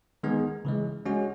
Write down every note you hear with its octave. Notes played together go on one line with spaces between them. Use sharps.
D#3 G#3 B3 D#4 G#4
C#3 E3 G#3
G#3 C#4 F#4